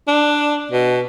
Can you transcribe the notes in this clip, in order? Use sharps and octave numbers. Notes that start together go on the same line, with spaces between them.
D4
B2